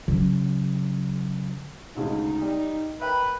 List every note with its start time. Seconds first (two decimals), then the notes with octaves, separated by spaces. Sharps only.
0.08 C#3 F#3
1.96 D2 C#3 G#3 D#4
2.42 G3
3.01 A#4 B4 E5 G5